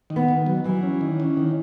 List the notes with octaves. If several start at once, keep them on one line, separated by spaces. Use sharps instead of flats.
D#3
B3
D#3
F#3
E3 F#3
C#4
D#3
C#4
D#3